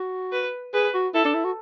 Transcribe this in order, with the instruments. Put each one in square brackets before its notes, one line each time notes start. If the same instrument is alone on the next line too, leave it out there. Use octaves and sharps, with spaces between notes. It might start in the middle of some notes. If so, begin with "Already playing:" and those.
Already playing: [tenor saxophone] F#4
[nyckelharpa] B4
[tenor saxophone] G#4 [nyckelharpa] B4
[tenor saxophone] F#4
[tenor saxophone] E4 [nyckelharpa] A4
[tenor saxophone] D4
E4
F#4